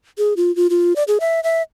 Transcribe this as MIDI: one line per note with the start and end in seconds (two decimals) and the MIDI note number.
0.18 0.34 68
0.37 0.54 65
0.56 0.67 65
0.70 0.93 65
0.96 1.03 74
1.08 1.18 68
1.20 1.40 76
1.43 1.62 76